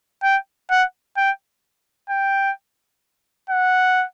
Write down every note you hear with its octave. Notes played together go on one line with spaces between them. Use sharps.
G5
F#5
G5
G5
F#5